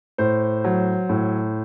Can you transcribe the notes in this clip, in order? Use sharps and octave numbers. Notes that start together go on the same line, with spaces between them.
A2 C5
F#3
A2